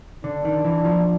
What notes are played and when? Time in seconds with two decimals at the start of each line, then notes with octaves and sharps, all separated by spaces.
0.24 D3 D4
0.45 D#3
0.65 E3
0.85 F3